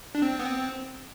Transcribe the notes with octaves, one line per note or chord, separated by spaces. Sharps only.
D4
C4
B3
C4